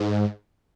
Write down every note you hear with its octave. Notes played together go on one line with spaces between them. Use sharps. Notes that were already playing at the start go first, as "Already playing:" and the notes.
Already playing: G#2